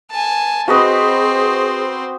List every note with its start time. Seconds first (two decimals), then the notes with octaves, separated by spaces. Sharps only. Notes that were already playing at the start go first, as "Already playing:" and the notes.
0.11 G#5 A5
0.68 C4 F#4 G#4 B4 C5 D#5